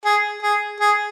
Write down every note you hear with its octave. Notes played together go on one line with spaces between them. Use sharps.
G#4
G#4
G#4